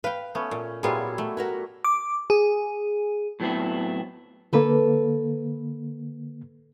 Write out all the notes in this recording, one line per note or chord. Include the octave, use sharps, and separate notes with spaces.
B4 F5 G5
A3 B3 C#4
A#2
A#2 F#3 G3 B3 E4 F4 G#4
A3
F#4 A#4 B4
D6
G#4
A2 F#3 B3 C4 E4
D3 A#3 A4 B4